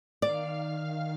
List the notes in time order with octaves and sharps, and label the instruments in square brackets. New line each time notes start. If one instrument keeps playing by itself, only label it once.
[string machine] D#3 F5 F6 [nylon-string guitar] D5